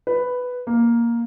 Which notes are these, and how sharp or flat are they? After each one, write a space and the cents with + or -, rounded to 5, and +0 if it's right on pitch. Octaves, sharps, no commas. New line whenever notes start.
B4 +5
A#3 +5